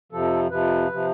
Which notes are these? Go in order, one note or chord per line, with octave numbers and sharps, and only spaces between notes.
F2 C3 F3 A4
F2 C3 F3 B4
C3 F3